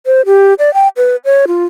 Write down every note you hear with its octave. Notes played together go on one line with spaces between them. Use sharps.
C5
G4
D5
G5
B4
C#5
F4